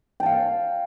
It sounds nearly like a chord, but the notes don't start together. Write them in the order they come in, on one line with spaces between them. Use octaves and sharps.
G5 A5 F5 C#5